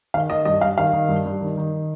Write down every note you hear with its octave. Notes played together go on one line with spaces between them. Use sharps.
D#3 F5
D#3 D#5
G2 D#5
G2 F5
D#3 F5
D#3
G2
G2
D#3
D#3